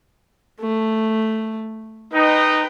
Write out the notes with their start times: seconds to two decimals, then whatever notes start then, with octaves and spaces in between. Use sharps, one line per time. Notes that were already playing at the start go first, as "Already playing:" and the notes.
0.61 A3
2.13 D#4 B4 G5